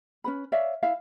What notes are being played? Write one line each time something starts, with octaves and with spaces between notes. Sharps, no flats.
C#4 B4 B5
C#5 D5 E5 F5
E4 E5 F5